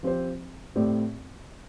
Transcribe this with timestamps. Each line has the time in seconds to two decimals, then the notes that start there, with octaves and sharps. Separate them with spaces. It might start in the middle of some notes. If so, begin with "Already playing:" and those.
0.03 F3 C4 G4 C5
0.75 A2 A3 C4 G4 D5